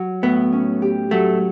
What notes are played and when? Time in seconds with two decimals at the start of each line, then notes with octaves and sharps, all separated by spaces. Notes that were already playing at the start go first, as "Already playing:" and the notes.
Already playing: F#3
0.23 A2 B3
0.52 C#4
0.82 G4
1.11 F#3 A3